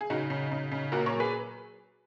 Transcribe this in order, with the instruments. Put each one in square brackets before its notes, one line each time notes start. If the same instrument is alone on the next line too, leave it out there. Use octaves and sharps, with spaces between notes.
[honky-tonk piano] G#4
C#3 D#4 F#4
C#3
C#3
C#3
A#2 F#4 A#4
A#4 C#5
F#3
G#4 B4